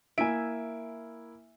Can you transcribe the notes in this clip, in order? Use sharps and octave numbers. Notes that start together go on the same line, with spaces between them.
A#3 E4 E5 G#5 D7